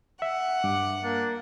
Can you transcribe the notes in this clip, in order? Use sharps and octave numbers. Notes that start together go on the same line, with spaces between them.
E5 F#5
G2 D6
A#3 D4